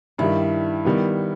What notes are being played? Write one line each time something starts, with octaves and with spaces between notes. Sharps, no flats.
G2 D#3 G3 E4
D#3 G3 B3